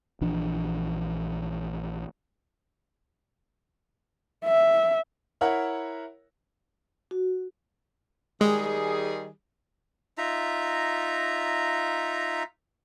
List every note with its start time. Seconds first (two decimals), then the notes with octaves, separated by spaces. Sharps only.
0.21 A#1 E3 F3 D4
4.45 E5
5.41 E4 A#4 C#5 E5 F#5
7.11 F#4
8.41 D#3 G3 G#3 G#4
10.18 D#4 F4 E5 A#5